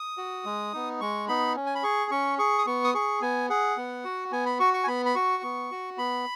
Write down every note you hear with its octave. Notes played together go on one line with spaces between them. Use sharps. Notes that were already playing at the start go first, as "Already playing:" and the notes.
Already playing: D#6
F#4
G#3
B3 D#4
G#3 C#6
B3 D#4 B5
C#4
G#5
B5
G#4 C#6
C#4 C#6
G#4 C#6
D#6
B3 C#6
D#6
G#4 C#6
B3 G#5
G#4 F#5
B3
F#4
B3 G#5
B5
F#4 C#6
C#6
G#5
B3 B5
B5
F#4 C#6
B3
F#4
B3 B5